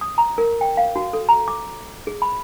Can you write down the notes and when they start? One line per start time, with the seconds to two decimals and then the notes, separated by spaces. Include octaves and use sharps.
0.01 D#6
0.18 A#5
0.38 A#4
0.61 G5
0.77 F5
0.96 F#4
1.13 A4
1.29 A#5
1.48 D6
2.07 G#4
2.22 B5